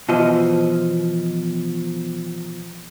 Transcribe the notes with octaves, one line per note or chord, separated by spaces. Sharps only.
B2 E3 F3 D#5